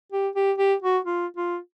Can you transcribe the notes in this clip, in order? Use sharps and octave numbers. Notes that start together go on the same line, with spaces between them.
G4
G4
G4
F#4
F4
F4